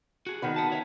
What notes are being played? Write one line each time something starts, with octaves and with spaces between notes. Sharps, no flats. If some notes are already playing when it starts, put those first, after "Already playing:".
F#4 G#4
D#3 B3 B4
F#5 A5
F#4 C#5 E5